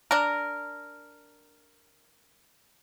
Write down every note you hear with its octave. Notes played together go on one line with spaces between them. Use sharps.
D4 A#4